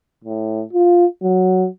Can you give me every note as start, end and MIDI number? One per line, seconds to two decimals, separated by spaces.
0.25 0.63 45
0.73 1.06 65
1.22 1.68 54